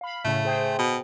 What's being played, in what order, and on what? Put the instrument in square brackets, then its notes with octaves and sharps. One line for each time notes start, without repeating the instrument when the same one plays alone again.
[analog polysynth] F5 B5
[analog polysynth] A2 C#3 [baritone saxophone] A3
[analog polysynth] G#4 C5 G5
[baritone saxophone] B2